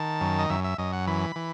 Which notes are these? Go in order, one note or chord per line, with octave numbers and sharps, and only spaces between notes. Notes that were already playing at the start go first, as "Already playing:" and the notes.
Already playing: D#3 A5
F#2
D#5
F#2 E5
E5
F#2 D#5
F#5
E3 B5
E3